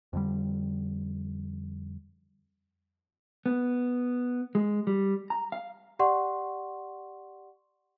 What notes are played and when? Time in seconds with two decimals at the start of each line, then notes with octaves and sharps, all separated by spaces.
0.13 F2 D3 G3
3.46 B3
4.55 G#3
4.87 G3
5.30 A#5
5.52 F5
5.99 G4 D5 F#5 C6 C#6